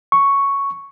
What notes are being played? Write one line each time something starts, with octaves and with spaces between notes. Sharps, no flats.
C#6